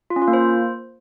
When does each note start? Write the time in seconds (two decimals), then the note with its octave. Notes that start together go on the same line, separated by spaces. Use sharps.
0.10 F4
0.16 C#4
0.22 F4
0.28 A#3
0.33 C5